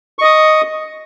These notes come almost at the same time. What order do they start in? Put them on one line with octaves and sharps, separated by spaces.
C#6 D#5 D#6